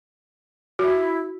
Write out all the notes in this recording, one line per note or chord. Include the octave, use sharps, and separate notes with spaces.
E4 F#4